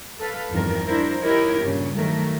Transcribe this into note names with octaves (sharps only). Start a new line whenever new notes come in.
A4 B4 F5
E2 G2 D#3 F3 C4 A#4
D4 E4 A#4 C5
D#4 E4 G4 A#4 C#5
G2 A#2 C#3
D#3 F#3 A3 A#4